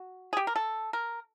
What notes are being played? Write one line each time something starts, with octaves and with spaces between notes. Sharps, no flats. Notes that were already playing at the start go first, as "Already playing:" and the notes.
Already playing: F#4
G#4
G4
A#4
A4
A#4